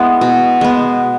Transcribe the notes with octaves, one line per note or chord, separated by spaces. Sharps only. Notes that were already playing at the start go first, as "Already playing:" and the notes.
Already playing: G#3 B3 E4
B2
G#3 B3